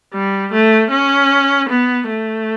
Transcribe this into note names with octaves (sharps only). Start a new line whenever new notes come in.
G3
A3
C#4
B3
A3